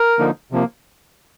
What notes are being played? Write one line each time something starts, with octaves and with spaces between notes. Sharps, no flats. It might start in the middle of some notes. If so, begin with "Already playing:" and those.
Already playing: A#4
D3 F3 A#3 D#4
C3 F3 A#3